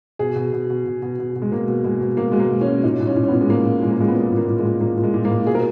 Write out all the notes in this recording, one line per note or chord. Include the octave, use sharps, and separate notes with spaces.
B2 G#4
B2
B2
B2
B2
B2
B2
B2
G#3
B2 A#3
B2
B2 G#3
B2
B2 A#3
B2 G#3
A#3
B2
C#4
B2
A#2 D#4
A#2
C#4
A#2
C#4
A#2 B3
G#3
A#2 A#3
A#2
A#2 G#3
A#3
A#2 G#3
B3
A#2 A#3
A#2 G#3
A#3
A#2
G#3
A#2
A#2 A#3
A#2
G#3
A#2
A#3
A#2
B2 G#4
A#4